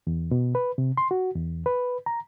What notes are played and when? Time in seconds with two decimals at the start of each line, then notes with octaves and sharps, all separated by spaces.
0.07 E2
0.31 B2
0.55 B4
0.78 C3
0.97 C6
1.11 F#4
1.35 E2
1.66 B4
2.06 A#5